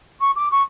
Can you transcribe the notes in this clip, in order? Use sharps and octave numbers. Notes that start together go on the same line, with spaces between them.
C#6
D6
C#6